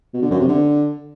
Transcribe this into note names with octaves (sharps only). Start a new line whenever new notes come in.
B2
D3
F#2
C3
D3